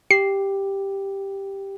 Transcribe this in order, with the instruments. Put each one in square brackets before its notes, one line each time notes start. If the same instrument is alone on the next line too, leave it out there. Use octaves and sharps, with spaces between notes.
[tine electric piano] G4 [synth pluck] C7